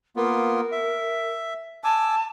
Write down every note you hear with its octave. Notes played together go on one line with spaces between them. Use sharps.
A#3 B3 F4 A#4
E5
G#5 A5 D6 E6